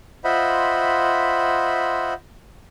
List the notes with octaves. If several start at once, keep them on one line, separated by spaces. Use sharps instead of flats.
F4 C5 D#5 E5 F#5 B5